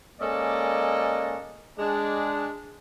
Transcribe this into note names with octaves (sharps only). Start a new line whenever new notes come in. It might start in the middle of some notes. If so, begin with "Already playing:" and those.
G#3 A#3 C#4 A4 D5 D#5
G#3 D4